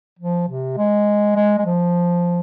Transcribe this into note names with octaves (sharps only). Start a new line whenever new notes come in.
F3
C3
G#3
G#3
G#3
F3